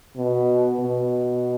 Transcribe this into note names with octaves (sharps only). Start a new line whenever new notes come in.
B2
B2